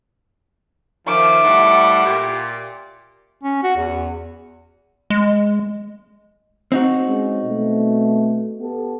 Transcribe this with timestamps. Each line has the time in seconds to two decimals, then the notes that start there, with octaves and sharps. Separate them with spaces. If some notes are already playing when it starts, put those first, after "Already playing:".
1.07 D#3 F3 E5 D6
1.44 A2 G3 F#5
2.06 A#2 G4
3.44 C#4
3.63 F#4
3.77 E2
5.10 G#3
6.72 C4 D#4 F#4
7.08 G#3 C#4
7.45 B2 A3
8.61 B3 G4 A4